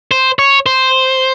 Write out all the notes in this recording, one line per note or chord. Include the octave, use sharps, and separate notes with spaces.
C5
C#5
C5